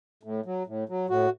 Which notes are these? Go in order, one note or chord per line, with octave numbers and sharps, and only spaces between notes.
A2
F#3
A2
F#3
A2 F#4